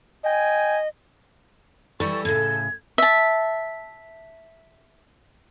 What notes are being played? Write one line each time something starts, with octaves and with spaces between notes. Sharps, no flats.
D#5 G5 G#5
E3 G3 A4 C#6
A2 C#3 G#6
E5 A5